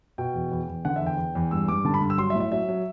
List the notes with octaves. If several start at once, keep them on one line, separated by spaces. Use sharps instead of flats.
B2 G5
E2
E2
E2
D3 F#5
E5
E2 G5
E2
E2
G2 E6
G2 D6
D3 A5
B5
G2
E6
F#3 C6
E5
A2
E5
F#3 E5
F#3